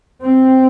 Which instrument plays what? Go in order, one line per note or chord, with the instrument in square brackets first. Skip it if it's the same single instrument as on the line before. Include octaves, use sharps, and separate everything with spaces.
[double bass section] C4